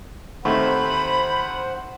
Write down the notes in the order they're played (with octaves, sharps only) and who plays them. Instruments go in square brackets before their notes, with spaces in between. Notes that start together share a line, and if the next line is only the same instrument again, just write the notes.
[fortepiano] D#2 A3 C4 [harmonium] C5 F#5 [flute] B5